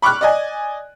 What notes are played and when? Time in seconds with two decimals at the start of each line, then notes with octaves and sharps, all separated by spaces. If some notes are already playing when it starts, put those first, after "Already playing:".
0.02 B5 C#6 D6 F6 F#6
0.21 D5 D#5 G#5